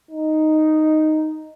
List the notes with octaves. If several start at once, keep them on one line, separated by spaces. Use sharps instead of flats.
D#4